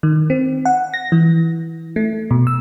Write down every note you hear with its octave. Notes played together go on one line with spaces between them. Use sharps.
D#3
C4
F#5
A#6
E3
A3
B2
E6